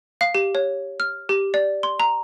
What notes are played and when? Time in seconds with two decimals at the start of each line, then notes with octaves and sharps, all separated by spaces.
0.21 F5
0.35 G4
0.55 C#5
1.00 F6
1.29 G4
1.54 D5
1.83 C6
2.00 A#5